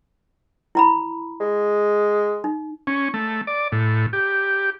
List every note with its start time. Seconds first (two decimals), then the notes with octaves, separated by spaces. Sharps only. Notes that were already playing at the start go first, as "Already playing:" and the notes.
0.75 E4 A#5 B5
1.40 G#3
2.44 D#4
2.87 C#4
3.14 A3
3.47 D5
3.72 A2
4.13 G4